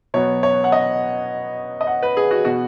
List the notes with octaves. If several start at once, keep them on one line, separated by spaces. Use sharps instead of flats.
B2 F#3 B3 C#5
C#5
F#5
D#5
D#5
F#5
B4
G#4
F#4
B2 B3 F#4